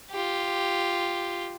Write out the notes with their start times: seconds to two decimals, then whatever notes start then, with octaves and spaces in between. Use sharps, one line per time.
0.11 F4 G4